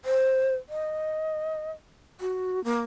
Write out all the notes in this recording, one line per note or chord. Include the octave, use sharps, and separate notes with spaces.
C5
D#5
F#4
A#3